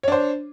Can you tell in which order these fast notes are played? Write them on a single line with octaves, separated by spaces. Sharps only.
C#5 D4 C5